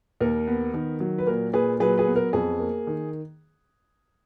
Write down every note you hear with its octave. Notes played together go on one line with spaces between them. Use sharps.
D#2 A#4
B3
D#3
F#3
B4
A#2 A#4
A#2 G#4 B4
F#3 G#4 B4
G#4 B4
B3
A#4
F2 G#4
A#3
D#3